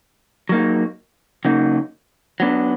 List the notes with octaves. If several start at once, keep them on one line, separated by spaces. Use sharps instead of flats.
F#3 A#3 D#4
C#3 F#3 A#3 D#4
F#3 B3 D4